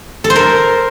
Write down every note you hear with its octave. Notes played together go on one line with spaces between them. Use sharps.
A4
C5
A#4